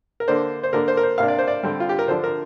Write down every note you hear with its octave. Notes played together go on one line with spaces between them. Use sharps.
A#4
D3 A#3 D4 C5
C5
D3 A#3 D4 A#4
C5
A#4
C5
C3 A#3 D4 F5
D5
C5
D5
D3 G3 C4
F4
G4
A#4
D3 F3 D4 C5
A#4